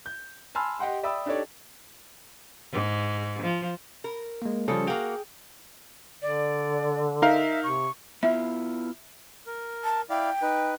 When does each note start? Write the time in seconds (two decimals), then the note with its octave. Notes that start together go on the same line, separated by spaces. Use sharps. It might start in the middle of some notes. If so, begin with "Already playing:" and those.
0.06 G6
0.55 G#5 A5 B5 C6 E6 F6
0.79 G4 D#5 F#5 G5 C6
1.03 D5 E5 G5 B5 D#6 E6
1.26 D4 D#4 G4 A4 C#5 D5
2.72 G#2
3.42 F3
4.04 A#4
4.42 G#3 A#3
4.68 C#3 F3 G3 C#4 A4
4.87 A#3 F#4 G#4 G5
6.22 D3 D5
7.22 D#4 A#4 E5 F5
7.64 C3 C#6
8.23 B3 E4 F4 E5
9.46 A#4
9.84 A5
10.10 E4 D5 F5 G5
10.42 D#4 B4